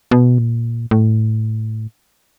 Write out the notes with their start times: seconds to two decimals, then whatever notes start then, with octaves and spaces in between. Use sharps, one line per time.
0.11 B2
0.38 A#2
0.91 A2